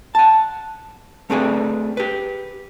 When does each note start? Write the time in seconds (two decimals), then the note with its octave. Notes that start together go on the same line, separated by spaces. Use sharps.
0.15 F#5 A5
1.30 A3 C4 D4 G#4 B4
1.97 G4 B4